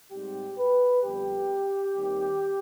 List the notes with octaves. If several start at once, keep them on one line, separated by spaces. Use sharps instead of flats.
G#2 G3 C4 G4
B4
F2 D3 G3 B3 G4
D#2 D#3 G3 C4